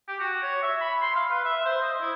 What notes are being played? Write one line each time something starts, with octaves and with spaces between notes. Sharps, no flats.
G4
F#4
C#5
E5
B5
C6
F5
B4
E5
C5
D#5
E4